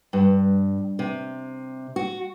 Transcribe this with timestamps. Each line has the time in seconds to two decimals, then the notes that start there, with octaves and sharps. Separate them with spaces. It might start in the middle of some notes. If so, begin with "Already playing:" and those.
0.13 G2
0.99 C3
1.96 F#4